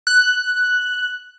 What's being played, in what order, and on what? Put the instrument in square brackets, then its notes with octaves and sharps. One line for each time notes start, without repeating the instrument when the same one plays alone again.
[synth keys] F#6